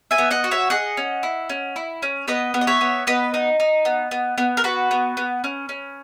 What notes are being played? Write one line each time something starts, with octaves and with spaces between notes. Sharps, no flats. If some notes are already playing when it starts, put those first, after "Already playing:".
E5 G#5
B3
D#5 F#5
F#4
C#5 E5
G#4 D#5 F#5
C#4
E4
C#4
E4
C#4
B3 B4 D#5
B3
D#5
C#5 E5
B3
B3 B4 D#5
D#4
D#4
B3
B3
B3
A#4
F#4 B4
B3
B3
C#4
C#4